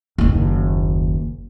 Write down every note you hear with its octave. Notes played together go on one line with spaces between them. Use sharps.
F#1 D#2